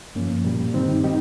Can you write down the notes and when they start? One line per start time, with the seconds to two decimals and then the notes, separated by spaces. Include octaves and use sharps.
0.15 G2 F3 A#3 C#4
0.44 A#2 G3
0.74 G2 D#3 G3 C4 D#4
1.04 D#3 G3 D#4 G4